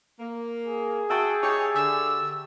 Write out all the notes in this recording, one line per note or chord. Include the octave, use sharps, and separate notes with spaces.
A#3
G#4
F#4 E5 F#5 G5 A5 C#6
D#4 G4 C#5
D3 E6